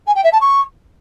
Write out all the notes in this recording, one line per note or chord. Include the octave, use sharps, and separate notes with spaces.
G#5
G5
E5
A5
C#6